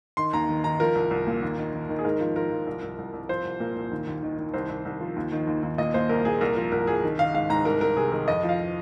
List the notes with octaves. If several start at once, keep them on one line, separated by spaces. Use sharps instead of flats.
D#3 C6
D#2 A#5
D#3
D#3 A#5
F3 A#4
C2
C2
A#2
D#2
D#3
D#3
D#3
G#4
G#2 A#4
F3
F3 A#4
F3
C2
C2
C2
C2
F3 C5
C2
A#2 A#4
C2
D#2
D#2
D#3
D#3
C2 C5
C2
C2
F3
D#2
D#3
D#2
D#2
A#2 D#5
A#2 C5
C2 A#4
A#2 G#4
C2 A#4
F3 A#4
C2 A#4
C2 G#4
D#3
D#3 F5
G#2 F5
G#2 A#5
C2 A#4
C2 A#4
C3 G#4
D#3 A#4
F2 D#5
F3
F5
F3